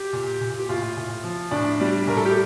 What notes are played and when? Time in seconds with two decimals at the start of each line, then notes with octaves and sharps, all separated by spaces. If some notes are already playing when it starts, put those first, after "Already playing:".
Already playing: G4
0.13 A#2
0.41 A#2
0.59 G4
0.69 A2 F4
0.97 A2
1.24 F3
1.51 A2 D4
1.80 G3
2.07 A2 A#4
2.17 A4
2.25 G4